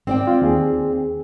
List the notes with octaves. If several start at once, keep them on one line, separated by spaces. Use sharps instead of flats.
C4 D5 G5
F4
D#2 G#4